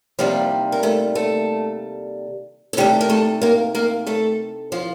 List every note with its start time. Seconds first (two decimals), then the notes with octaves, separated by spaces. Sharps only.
0.19 C3 D#3 F3 G3 A#3 F4
0.72 A#4
0.83 A3 A4
1.15 A3 A4
2.73 A4
2.77 C3 D#3 G3 A3 G4
3.01 A#4
3.10 A3 A4
3.42 A#3 A#4
3.75 A#3 A#4
4.07 A3 A4
4.72 F3 F4